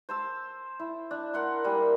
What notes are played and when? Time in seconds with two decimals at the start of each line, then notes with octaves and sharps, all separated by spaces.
0.09 C5 A5 E6
0.79 E4
1.11 D4
1.34 A#4 F#5 C6
1.64 G3 A#3 G#4